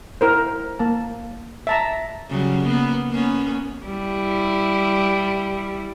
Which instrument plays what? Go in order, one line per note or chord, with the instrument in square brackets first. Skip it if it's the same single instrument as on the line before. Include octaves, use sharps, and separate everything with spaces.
[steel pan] E4 A#4 C5
A#3 A5
E5 A5 A#5
[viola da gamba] C#3 F#3 G3
A#3 B3
A#3 B3 C#4
G3 E4